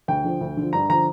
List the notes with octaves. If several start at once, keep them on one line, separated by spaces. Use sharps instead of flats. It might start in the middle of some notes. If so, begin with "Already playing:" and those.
D2 G5
D3 F3
D2
D3 F3
G2 A#5
D3 F3 A#5